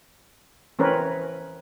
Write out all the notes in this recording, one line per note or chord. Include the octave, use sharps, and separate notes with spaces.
E3 C4 C#4 A#4 B4 C#5